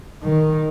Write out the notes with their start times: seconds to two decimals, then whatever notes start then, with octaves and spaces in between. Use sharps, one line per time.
0.23 D#3